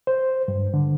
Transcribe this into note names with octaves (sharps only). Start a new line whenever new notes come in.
C5
G2
D3